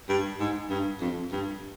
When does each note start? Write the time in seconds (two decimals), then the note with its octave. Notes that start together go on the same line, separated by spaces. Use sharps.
0.09 G2
0.40 G#2
0.70 G2
1.01 F2
1.32 G2